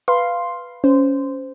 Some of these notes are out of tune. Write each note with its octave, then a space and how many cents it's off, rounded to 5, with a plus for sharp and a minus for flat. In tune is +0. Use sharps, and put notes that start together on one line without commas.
B4 +0 F5 -10 C6 +5
C#4 +5 C5 -15